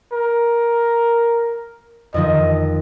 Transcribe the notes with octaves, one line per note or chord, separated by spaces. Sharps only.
A#4
F2 D#3 F3 D#5